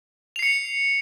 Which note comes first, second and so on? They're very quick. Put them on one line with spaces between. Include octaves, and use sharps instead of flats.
F7 C7 C#7